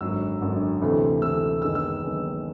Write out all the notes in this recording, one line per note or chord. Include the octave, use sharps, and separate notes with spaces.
G#1 F#2 D3 F#3 E6
G#1 F#2 D3 F#3
D2 C3 E3 A3
D2 C3 E3 A3 E6
F#1 F#2 D#3 G#3 B3 E6
E6
F#1 F#2 D#3 G#3 B3